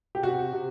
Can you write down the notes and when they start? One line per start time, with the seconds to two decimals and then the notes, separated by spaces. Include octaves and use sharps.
0.15 G4
0.23 C3 F#4
0.53 C3